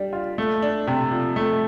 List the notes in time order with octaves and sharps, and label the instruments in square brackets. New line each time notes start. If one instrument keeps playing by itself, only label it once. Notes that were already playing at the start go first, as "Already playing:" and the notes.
Already playing: [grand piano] G3 D4
F4
A3
D4
C3
F3
A3